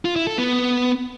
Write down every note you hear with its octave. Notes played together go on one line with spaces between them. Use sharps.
F4
E4
A4
B3